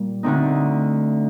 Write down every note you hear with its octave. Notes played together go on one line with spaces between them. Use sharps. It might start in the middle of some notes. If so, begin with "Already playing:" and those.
Already playing: A#2 G3
D2 D3 A3 C4 D#4